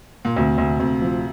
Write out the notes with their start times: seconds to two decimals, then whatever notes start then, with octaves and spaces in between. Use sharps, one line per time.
0.25 A#2
0.36 D2 C3
0.58 D2
0.79 D2 C3
1.02 F3